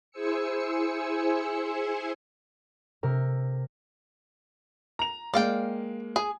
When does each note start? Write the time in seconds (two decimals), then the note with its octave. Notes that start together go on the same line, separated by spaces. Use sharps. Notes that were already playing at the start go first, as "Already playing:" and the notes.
0.11 E4 G#4 C5 G#5 E6 C#7
3.03 C3 A#4
4.99 A#5 F7
5.34 G#3 A#3 D5 F5 G5
6.16 G#4 G#5